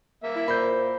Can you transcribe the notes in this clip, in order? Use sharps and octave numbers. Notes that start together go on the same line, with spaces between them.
A#3 E5
E4
A#2 A#4 C5 B5 G6